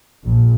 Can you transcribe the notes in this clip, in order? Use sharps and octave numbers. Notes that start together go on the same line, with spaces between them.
A#1